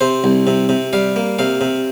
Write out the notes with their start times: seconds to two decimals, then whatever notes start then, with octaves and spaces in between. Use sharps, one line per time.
0.01 C3 C5
0.24 C2
0.47 C3
0.69 C3
0.93 G3 F5
1.16 A#3
1.39 C3 F5
1.61 C3